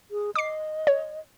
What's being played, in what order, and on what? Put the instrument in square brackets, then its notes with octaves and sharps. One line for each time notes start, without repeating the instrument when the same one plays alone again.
[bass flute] G#4
[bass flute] D#5 [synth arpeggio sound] D6 C7
[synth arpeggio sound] C#5